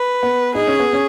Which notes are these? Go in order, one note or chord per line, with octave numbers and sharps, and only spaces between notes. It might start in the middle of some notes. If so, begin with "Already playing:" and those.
Already playing: B4
B3
D#4 G#4
C#4
B3
C#4